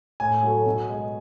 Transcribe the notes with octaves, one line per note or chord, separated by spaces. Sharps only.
A2 G#5
F#3 A3
B2
G#3